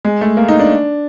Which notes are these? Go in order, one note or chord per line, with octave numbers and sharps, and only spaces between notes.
G#3
A3
A#3
D#4
D4